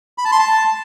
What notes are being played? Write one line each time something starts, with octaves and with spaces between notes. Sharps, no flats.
B5
A5
C6
A5